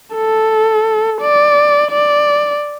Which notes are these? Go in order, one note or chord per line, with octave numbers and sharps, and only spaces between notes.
A4
D5
D5